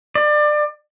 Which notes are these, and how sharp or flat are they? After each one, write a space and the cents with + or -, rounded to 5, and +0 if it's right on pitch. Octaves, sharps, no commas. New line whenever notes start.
D5 +25